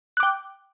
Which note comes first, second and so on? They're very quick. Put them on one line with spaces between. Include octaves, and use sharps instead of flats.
F#6 D6 G5